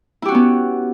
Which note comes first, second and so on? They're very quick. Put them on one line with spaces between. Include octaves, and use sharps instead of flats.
E4 G4 F#4 C#4 B3